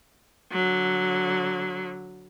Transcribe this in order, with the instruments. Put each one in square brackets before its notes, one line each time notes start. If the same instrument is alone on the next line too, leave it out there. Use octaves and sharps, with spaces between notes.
[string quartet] D3 F#3